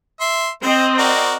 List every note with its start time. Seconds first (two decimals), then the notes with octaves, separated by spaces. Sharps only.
0.21 E5 C6
0.62 C4 C5 D#5
0.99 F#4 A#4 D5